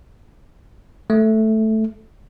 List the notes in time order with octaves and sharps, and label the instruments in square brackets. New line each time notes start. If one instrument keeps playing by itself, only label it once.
[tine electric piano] A3